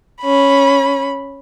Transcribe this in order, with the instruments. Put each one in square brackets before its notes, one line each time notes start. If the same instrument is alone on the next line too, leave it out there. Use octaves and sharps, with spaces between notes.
[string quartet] C#4 B5